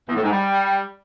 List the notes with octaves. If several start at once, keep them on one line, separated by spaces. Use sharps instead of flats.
E2
A2
G#2
G3